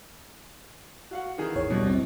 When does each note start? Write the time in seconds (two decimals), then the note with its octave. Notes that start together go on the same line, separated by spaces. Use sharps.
1.11 F#4 F5 F#5
1.38 D#3 E3 G#4
1.56 G#1 D#2 C#5
1.70 C2 G2 B2
1.86 D1 C4